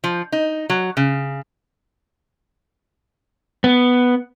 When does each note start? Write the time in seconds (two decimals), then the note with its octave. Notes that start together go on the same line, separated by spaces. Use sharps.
0.04 F3
0.32 D#4
0.70 F#3
0.97 C#3
3.64 B3